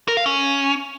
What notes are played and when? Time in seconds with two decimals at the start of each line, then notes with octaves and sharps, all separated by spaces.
0.08 A#4
0.17 F5
0.26 C#4